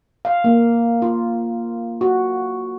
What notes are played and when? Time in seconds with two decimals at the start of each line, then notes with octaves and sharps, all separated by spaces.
0.25 F5
0.44 A#3
1.02 F4
2.01 F#4